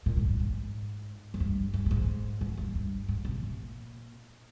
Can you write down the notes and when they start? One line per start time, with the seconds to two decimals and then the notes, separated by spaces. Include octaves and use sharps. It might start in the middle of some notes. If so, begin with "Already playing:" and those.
0.06 A#2
0.17 G#2
0.29 G2
0.40 G#2
1.34 F2
1.40 G2
1.74 G2
1.86 A#2
1.91 G#2
2.41 G#2
2.58 G2
2.75 G2
3.09 G#2
3.25 C3
3.42 A#2